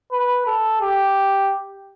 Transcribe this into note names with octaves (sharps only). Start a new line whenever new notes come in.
B4
A4
G4